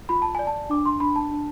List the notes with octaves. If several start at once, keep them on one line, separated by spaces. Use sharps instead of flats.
F4 B5
A5
D5 G#5
A5
D4 D6
C6
D4 B5
A5
D4